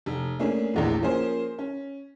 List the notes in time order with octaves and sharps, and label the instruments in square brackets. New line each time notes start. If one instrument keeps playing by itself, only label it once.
[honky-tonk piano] F1
A3 A#3 C#4 D4 G#4
A#1 E2 A2
F3 A#3 C#4 G#4 A#4 C5
C#4